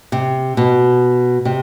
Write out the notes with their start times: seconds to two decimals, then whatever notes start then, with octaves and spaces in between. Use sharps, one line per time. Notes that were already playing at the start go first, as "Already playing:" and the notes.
0.12 C3
0.57 B2
1.45 C3